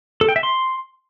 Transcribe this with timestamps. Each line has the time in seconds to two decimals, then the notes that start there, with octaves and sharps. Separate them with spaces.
0.21 A4
0.28 G5
0.36 E5
0.43 C6